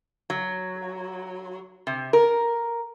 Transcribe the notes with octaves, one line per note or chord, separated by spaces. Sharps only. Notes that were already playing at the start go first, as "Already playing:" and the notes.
F#3
C3
A#4